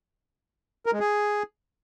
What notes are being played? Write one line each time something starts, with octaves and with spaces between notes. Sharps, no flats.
A#4
G#3
G#4